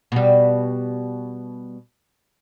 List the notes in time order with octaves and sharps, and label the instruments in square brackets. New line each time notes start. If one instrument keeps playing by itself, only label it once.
[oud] B2 G3